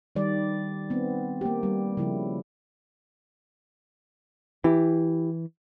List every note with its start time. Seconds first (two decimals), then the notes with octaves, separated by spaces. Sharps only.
0.16 D#3 G3 D5
0.90 B3 C4
1.41 A#3 G4
1.63 G3
1.97 C#3 F3 E4
4.64 E3 E4 G4